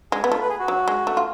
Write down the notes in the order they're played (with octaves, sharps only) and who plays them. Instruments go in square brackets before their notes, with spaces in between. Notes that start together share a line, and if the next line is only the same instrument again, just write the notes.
[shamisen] G#3 [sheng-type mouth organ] G#4
[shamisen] B3
[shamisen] A3 [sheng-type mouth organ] F4
[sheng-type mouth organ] B4
G#4
F#4
[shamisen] F#3
G#3
A3
F4